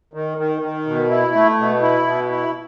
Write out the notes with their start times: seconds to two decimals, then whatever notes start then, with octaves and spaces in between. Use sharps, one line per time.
0.13 D#3
0.38 D#3
0.62 D#3
0.87 B2
1.10 E4
1.35 A3
1.59 B2
1.82 E4
2.07 B2
2.31 E4